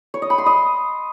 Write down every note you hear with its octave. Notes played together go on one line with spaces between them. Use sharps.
C#5
D#5
B5
C6
D#5